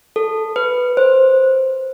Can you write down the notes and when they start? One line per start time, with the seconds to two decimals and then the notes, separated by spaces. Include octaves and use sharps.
0.16 A4
0.56 B4
0.97 C5